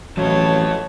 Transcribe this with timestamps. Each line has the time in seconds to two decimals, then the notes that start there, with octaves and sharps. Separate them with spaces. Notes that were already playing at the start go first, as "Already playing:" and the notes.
0.17 A1 F3 F#3 A4 C#5 D#5 A5